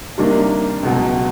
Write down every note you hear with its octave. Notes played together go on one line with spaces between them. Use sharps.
C3 D#3 G3 A#3 D4
C#2 B2 F#3